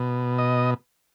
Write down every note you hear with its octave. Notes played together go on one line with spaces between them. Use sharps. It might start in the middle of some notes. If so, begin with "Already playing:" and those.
Already playing: B2
D#5